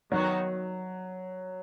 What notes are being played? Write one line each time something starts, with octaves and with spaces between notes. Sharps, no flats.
D#3 F#3 B3 D#4 F#4 C#5